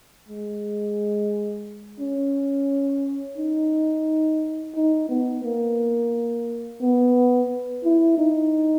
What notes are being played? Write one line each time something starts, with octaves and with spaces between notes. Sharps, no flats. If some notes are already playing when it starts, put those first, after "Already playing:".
G#3
C#4
D#4
D#4
B3
A#3
B3
E4
D#4